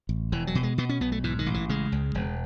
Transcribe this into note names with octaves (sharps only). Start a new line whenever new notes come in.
A1
E1 E3
F#3
B2
G#3
B2 B3
C#4
B1 B3
A3
G#2 E3
D#3
A1
E3
C#3 G#3
C#2
E1